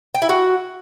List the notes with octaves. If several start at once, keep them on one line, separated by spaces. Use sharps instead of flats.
G5
E4
F#4